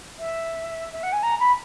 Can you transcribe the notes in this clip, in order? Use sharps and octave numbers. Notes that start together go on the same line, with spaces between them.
E5
E5
F#5
G#5
A#5
B5